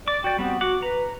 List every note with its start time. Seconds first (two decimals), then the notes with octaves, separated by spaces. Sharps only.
0.08 D5 D6
0.24 F#4 D5 G5
0.38 G3 B3 C4 F#4
0.61 F#4 F#5 D6
0.82 B4 A#5